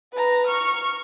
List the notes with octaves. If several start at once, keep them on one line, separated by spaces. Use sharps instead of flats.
B4 A#5
C#6 F6